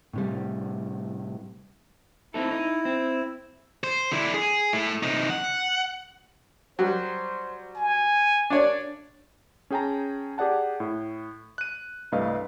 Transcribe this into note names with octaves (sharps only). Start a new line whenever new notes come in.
A2 C3 G3
C4 D#4 E4 A4
D#4
C4
C5
D3 E4
G#4
A3 E4
C3 D#4
F#5
F#3 G3 C5
G#5
D4 C#5 D5
C#4 G#4 G5 A5 A#5
G4 G#4 D5 F#5 A5
A2
F#6 D#7
C2 G2 A3 B4 D#5 F5